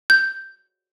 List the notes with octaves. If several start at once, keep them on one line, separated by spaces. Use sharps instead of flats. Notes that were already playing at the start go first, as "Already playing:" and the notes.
G6